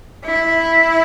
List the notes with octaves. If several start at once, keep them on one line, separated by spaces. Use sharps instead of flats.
E4